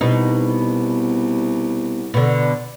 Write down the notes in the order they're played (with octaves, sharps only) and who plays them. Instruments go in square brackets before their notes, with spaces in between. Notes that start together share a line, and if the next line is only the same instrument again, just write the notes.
[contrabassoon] C2 [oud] B2 D#4
[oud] B2 D3